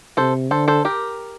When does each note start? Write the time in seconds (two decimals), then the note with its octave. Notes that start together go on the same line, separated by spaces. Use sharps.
0.17 C3 A4 C5
0.51 D3 A4 C5
0.68 A4 C5
0.85 G4 A#4